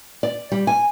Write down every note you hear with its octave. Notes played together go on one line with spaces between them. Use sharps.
D5
G3
G#5